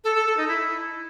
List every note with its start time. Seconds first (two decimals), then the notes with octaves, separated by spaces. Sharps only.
0.04 A4
0.15 A4
0.26 A4
0.37 D#4
0.48 E4